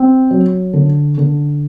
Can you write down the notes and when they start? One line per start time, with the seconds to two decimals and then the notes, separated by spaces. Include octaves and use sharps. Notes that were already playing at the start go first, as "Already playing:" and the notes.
Already playing: C4
0.31 F#3
0.73 D3
1.17 D3